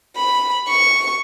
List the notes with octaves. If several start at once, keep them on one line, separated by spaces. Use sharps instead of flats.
B5
C#6